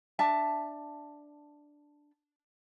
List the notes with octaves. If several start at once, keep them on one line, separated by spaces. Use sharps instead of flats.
D4 E5 A5